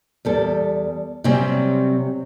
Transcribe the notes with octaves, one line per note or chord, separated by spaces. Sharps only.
E2 G3 A4
C3 F#3 G3 C4 C#4